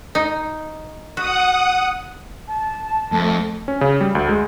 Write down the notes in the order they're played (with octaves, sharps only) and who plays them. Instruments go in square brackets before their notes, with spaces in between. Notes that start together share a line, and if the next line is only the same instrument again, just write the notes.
[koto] D#4
[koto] F#4 [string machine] F#5 D#6
[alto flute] A5
[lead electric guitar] F2 [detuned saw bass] A3
[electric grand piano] C#4
C#3
G3
D2
G#3